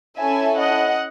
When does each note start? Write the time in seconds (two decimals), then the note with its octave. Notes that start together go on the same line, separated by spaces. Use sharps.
0.19 C#4 E4 A4 E5 G#5
0.58 D#5 F#5